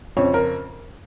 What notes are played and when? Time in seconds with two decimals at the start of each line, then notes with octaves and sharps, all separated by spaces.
0.17 F2 C#3 F3 C#5
0.34 A#4